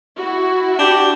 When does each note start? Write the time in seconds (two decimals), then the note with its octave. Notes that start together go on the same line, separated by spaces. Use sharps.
0.19 E4 F#4
0.79 D4 G4